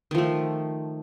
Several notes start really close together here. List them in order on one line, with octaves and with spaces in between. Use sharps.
D#3 F3 A3